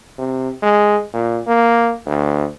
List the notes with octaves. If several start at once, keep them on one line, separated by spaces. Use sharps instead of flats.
C3
G#3
A#2
A#3
D2